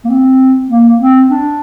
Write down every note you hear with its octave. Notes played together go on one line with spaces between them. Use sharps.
A#3
C4
A#3
C4
D4